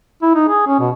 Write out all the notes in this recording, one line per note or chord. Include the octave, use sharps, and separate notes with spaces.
E4
D#4
G#4
C#4
B2